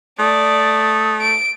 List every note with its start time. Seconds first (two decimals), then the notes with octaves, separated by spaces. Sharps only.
0.19 A3 D5 D#6
1.21 D7